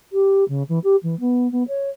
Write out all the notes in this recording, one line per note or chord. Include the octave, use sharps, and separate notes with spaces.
G4
C#3
E3
G4
E3
B3
B3
C#5